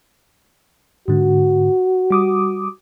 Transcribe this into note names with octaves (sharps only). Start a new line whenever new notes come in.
G#2 D3 F#4
G3 D6 D#6